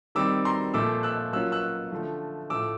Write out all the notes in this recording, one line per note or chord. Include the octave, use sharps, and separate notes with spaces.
D#3 G3 C4 D6 E6
A#5 C6
A#2 F3 A3 D6 E6
E6 F#6
F#3 A#3 C#4 F4 E6 F#6
E6 F#6
D3 F3 A3
A2 F3 A3 D6 E6